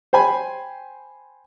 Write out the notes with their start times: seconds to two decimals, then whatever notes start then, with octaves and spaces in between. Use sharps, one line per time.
0.13 C5 G5 G#5 B5